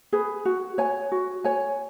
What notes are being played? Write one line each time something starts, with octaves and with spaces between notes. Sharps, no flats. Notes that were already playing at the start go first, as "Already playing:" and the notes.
G#4 B4
F#4
C#5 G#5
F#4
C#5 G#5